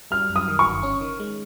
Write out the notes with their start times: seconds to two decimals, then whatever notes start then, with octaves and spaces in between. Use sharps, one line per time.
0.11 G3 F6
0.30 F#2
0.36 D#6
0.48 D#3
0.59 C#6
0.66 G1
0.83 C#4
1.01 D#3
1.20 G#3